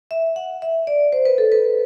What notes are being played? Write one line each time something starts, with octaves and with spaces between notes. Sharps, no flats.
E5
F#5
E5
D5
C5
B4
A4
B4